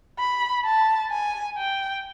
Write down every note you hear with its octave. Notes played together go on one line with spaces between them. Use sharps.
B5
A5
G#5
G5